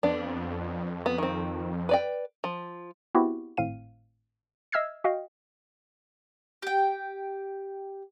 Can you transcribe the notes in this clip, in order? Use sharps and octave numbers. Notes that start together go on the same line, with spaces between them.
F2 B3 D4
B3
D#3 C4
B4 D5 G5
F3
B3 C4 E4 F#4 G4
G#1 A2 C4 F5 D#7
D#5 E5 E6 F6 G#6 C7
F#4 D#5 F5 G5
G4 G5